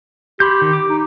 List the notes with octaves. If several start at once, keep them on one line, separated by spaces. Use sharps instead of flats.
G4 B5 C6 G6
D#3
D6
D#4